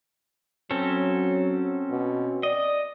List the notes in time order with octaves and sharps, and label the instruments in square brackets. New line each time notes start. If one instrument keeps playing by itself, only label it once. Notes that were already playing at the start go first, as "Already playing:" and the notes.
[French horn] F#3 [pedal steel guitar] C4 C#4 A4
[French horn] B2
[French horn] D5 [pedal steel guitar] D#5